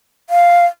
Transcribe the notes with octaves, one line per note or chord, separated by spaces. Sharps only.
F5